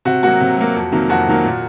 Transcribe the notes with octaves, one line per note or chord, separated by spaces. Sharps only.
C3 F#4
F#3 A#3 F#4
C3
F#3 A#3
F2
C3 D#3 F#3 A#3
F2 F#4
C3 D#3 F#3 A#3
A#2